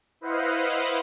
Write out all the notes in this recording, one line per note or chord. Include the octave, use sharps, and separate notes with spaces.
E4 B4 C5 D#5 F5 F#5